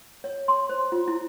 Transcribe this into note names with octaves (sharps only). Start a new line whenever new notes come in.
C#5
C6
C5
F4
E4